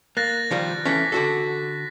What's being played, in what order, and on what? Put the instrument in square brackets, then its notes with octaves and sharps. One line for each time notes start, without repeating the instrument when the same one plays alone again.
[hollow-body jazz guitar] A#3 [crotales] F#6 A6 A#6
[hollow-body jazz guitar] D#3 F3 G3
[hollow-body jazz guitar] E3 A3 C#4 [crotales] B6
[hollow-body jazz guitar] D3 F#4 A4